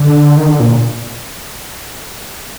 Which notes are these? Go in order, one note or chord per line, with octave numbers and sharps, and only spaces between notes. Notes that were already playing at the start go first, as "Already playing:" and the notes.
Already playing: D3
D#3
D3
A#2